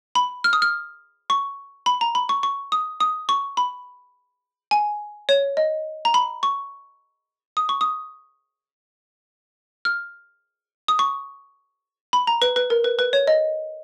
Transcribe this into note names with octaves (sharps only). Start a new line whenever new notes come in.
B5
F6
D#6
F6
C#6
B5
A#5
B5
C#6
C#6
D#6
D#6
C#6
B5
G#5
C#5
D#5
A#5
B5
C#6
D#6
C#6
D#6
F6
D#6
C#6
B5
A#5
B4
B4
A#4
B4
B4
C#5
D#5